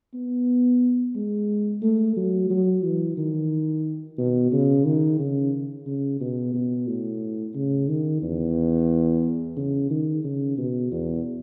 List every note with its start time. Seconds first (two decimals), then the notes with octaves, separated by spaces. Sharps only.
0.14 B3
1.15 G#3
1.82 A3
2.17 F#3
2.50 F#3
2.84 E3
3.17 D#3
4.18 B2
4.52 C#3
4.85 D#3
5.19 C#3
5.87 C#3
6.20 B2
6.54 B2
6.87 A2
7.55 C#3
7.88 D#3
8.22 E2
9.57 C#3
9.90 D#3
10.24 C#3
10.58 B2
10.92 E2